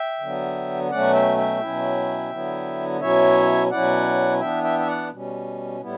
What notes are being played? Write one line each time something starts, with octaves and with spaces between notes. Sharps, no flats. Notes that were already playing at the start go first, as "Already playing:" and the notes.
Already playing: E5 G5
D3 F#3 B3
B2 F#3 A3 C#4 D5 F#5
E5 G5
E5 G5
B2 F#3 C#4 E4
D3 F#3 B3 E4
B2 F#3 C#4 E4 C#5 E5
B2 F#3 C#4 E4 D5 F#5
E3 B3 D4 E5 G5
E5 G5
E5
D5 F#5
B2 G3 C#4
A2 G3 B3 E4